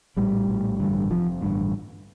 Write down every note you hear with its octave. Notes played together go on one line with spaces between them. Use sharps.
A#1 A2 G3
A#1 A2
A1 G2 D3
F1 F2 C3 F3
A1 G2 D3